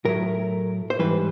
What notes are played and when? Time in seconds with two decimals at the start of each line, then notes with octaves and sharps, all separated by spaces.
0.05 A2 F#3 A3 A#4
0.90 C5
0.99 G#2 E3 G3 B4